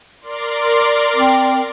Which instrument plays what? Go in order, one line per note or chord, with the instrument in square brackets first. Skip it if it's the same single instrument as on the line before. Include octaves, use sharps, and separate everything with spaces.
[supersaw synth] A#4 D5 C6
[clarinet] C4